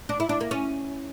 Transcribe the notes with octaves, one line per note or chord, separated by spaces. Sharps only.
D4
E4
D4
A#3
C#4